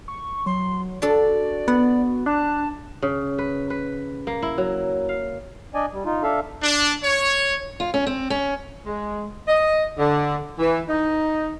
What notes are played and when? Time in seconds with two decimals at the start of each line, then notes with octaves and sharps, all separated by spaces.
0.08 C#6
0.46 F#3 C6
1.02 D4 F#4 A4 D5
1.68 B3 F#5
2.26 D4 A5 F#6
3.02 C#3
3.38 B4
3.70 B4
4.27 A#3
4.42 E4
4.58 F#3
5.09 F5
5.75 D4 D5 D#5 G#5
5.93 G3
6.05 D#4 F4
6.23 D4 A4 E5 F5
6.63 D4
7.03 C#5
7.80 F4
7.94 C#4
8.07 C4
8.30 C#4
8.86 G#3
9.47 D#5
9.98 D3
10.59 E3
10.89 D#4